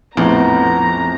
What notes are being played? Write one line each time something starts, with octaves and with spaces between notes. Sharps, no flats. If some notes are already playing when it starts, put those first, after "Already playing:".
A#1 F2 A2 B3 A#5